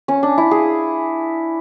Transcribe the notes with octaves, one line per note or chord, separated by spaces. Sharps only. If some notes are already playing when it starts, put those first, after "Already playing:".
C#4
D4
E4
G#4